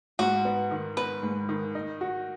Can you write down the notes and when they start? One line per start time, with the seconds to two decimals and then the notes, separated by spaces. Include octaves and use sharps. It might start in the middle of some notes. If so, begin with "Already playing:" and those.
0.19 G#2 F#4
0.45 B3
0.71 D#3
0.97 B3 B4
1.23 G#2
1.49 D#3
1.75 D#4
2.01 F#4